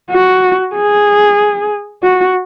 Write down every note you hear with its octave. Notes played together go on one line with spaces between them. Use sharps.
F#4
G#4
F#4